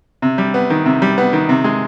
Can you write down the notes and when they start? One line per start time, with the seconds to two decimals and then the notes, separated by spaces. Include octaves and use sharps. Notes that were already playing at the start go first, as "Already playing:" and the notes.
0.22 C3
0.38 G3
0.54 B3
0.70 D#3
0.85 C3
1.02 G3
1.18 B3
1.33 D#3
1.49 C3
1.64 G#3